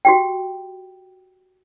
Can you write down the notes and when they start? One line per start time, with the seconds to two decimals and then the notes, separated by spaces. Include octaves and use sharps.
0.05 F#4 G4 G5